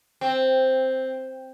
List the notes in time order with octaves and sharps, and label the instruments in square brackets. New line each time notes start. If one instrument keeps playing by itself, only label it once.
[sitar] C4